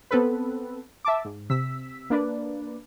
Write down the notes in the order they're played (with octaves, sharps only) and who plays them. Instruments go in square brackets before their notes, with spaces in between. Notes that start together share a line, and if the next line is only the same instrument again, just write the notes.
[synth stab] B3 C4 A4 B4
E5 A5 D6
G#2
C3 E6 B6
A#3 D4 B4 D5